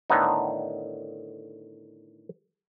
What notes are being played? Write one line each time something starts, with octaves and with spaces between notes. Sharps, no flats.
A2 D3 D#3 B3 D#4